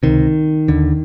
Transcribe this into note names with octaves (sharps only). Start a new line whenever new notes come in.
C#2 C3 D#3
D#2 D3